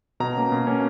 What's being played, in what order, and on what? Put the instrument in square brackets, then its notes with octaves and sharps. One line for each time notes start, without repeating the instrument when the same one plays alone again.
[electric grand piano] B2 A#5
A#3 C#4
B2
A#3 C#4